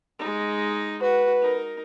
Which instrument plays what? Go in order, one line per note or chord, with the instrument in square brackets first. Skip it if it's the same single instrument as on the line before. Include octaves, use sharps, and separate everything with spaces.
[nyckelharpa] G#3 D#4
[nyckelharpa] F#4 [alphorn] B4
[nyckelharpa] D#4 A#4